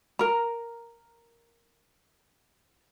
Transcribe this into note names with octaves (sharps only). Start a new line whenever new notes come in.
A#4 A#5